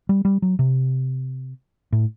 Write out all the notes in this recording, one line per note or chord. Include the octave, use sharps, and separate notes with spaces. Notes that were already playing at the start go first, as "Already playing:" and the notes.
G3
G3
F#3
C3
A2